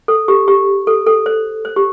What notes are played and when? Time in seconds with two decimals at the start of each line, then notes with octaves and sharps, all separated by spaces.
0.08 A4
0.28 G4
0.48 G4
0.87 A4
1.07 A4
1.26 C5
1.65 C5
1.76 G4